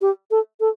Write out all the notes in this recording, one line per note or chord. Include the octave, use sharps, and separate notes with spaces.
G4
A4
A4